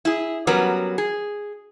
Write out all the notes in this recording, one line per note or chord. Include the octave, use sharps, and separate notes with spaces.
E4 G#4
F#3 G3 B3 C#4 A#4 B4
G#4